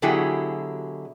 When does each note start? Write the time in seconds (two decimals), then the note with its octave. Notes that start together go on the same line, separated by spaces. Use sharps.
0.02 B2 D3 F#3 E4 G4 G#4